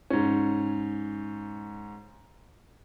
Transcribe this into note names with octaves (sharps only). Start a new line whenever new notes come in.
G#2 C#4